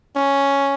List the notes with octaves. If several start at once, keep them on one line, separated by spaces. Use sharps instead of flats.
C#4